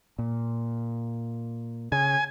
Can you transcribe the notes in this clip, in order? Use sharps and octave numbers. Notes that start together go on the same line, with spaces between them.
A#2
C#3 G#5